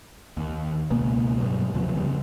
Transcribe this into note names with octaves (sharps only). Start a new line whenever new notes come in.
D#2
C#2 B2 A#3 B3
G2 B2 F#3 B3
D#2 C3 F3 F#3
G1 C#3 G3 B3